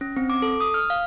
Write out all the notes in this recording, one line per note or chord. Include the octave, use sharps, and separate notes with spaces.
C#4
C4
D6
A4
D#6
F6
F5